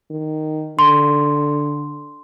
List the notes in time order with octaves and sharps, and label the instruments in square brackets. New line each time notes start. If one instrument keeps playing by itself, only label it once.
[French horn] D#3
[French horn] D3 [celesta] C6